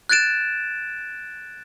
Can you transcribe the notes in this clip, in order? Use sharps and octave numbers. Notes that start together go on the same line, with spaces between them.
F#6 G#6 A6 D7 E7